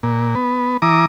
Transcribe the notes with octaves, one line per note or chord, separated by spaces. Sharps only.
A#2
B3
E3 A#5 D6 D#6